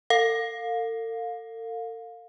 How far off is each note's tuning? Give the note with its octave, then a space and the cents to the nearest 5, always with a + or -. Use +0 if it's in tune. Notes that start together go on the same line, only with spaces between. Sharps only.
A4 +45 F5 +25